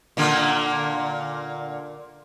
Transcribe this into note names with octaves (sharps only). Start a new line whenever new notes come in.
A#2 D3 A#3